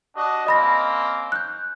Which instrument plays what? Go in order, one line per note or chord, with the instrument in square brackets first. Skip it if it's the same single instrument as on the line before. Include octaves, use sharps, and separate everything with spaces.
[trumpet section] D4 F#4 D#5
[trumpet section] A#3 C4 C#4 [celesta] D#5 B5 A#6
[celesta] F#6 G6